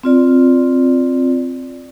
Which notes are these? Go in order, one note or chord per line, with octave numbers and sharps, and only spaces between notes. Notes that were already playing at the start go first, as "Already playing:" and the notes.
C4 F4 D5